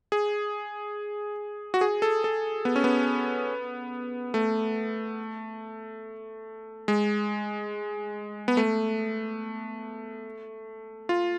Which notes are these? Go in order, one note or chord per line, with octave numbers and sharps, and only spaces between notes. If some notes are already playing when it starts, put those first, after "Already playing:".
G#4
F#4
G#4
A4
A4
B3
C#4
B3
A3
G#3
B3
A3
F4